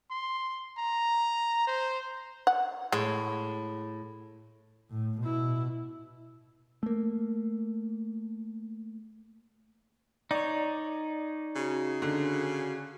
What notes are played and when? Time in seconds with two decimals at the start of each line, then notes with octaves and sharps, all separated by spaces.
0.11 C6
0.77 A#5
1.67 C5
2.47 F#5
2.92 A2 G#3
4.91 A2
5.21 B2 E4
6.83 A3 A#3
10.31 D#4 C#5 D5
11.56 C#3 F#4
12.02 D3